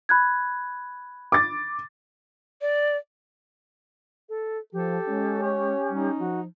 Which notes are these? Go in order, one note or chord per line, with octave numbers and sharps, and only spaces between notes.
B5 F#6 G#6
D6 A6
D5
A4
F3 G4 A4
G#3 C#4
C#5
G3 D#4
F3 F#4